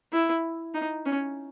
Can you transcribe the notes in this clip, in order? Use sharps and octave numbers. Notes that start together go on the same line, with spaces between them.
E4
D#4
C#4